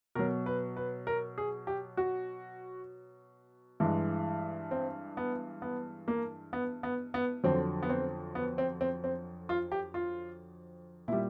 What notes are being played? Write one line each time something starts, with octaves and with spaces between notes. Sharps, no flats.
B2 F#3 A#4
B4
B4
A#4
G#4
G4
F#4
G2 E3 G#3
C4
B3
B3
A#3
B3
B3
B3
F2 D3 F#3 C4
B3
C4
B3
C4
C4
C4
F4
G4
F4
A#2 G3 E4